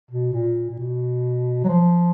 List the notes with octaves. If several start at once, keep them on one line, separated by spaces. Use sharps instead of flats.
B2
A#2
A#2
B2
F#3
F3